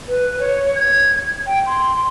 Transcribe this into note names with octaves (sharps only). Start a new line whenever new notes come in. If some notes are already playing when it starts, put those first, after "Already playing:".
B4
C#5
G#6
G5
C6